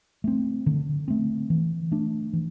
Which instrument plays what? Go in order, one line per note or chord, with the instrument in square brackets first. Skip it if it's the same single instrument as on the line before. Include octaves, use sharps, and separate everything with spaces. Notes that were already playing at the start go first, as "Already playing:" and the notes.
[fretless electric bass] A3 C4
D3
A3 C4
E3
A3 D4
E3